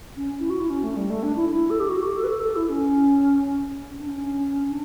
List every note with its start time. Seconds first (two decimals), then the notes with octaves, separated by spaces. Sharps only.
0.17 C#4
0.40 E4
0.50 F#4
0.60 E4
0.70 C#4
0.83 A3
0.96 G3
1.10 A3
1.23 D4
1.36 E4
1.49 E4
1.70 A4
1.80 G4
1.90 F#4
2.03 G4
2.16 A4
2.24 B4
2.30 A4
2.43 A4
2.56 E4
2.70 C#4
3.90 C#4
3.99 D4
4.09 C#4
4.69 D4